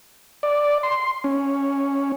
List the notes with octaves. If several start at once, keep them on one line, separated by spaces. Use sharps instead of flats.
D5
C6
C#4